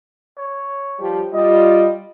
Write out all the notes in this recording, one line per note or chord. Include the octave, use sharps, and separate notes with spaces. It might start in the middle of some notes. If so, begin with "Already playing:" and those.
C#5
F3 G3 G4
G3 F4 D#5